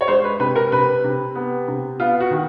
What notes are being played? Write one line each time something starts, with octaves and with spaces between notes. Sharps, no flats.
C#5
G#3 C5
B4
C3 B4
A#4
C3 B4
C3
B3
C3
B3 F4
F#4
D#3